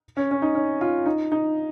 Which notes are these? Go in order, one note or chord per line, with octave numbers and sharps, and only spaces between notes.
C#4
C#4
D#4
C#4
F4
D#4
D#4